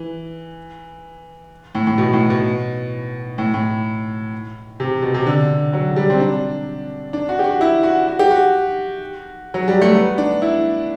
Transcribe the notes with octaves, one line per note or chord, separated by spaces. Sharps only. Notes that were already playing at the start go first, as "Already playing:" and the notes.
Already playing: E3
A2
A2
B2
A2
B2
A2
A2
C3
B2
C3
D3
F#3
G3
C4
D4
D4
F#4
G4
F#4
E4
F#4
F#4
G4
F#4
F#3
G3
A3
B3
D4
E4